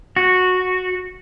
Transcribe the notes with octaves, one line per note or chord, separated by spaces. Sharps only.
F#4